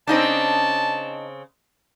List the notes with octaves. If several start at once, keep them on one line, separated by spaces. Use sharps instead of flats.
C#3 C4 D4 D#4 D#5 A5